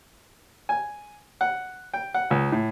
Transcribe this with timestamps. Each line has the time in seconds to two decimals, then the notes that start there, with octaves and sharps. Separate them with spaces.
0.69 G#5
1.41 F#5
1.94 G5
2.14 F#5
2.31 C#2
2.52 A2